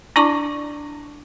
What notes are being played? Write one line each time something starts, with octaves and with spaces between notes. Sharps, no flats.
D4 E4 D5 A5 C#6 D6